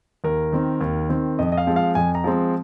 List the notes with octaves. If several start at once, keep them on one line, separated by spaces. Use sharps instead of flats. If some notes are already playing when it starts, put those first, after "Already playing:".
D#2 A#4
D#3 C4
D#2
D#3 C4
F2 D#5
D#5
F5
F3 G#3 C4
F5
F2 G#5
A#5
F3 G#3 C4